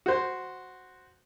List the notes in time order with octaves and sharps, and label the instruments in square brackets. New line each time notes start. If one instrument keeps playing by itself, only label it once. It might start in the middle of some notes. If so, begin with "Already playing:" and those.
[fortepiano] F#4 C5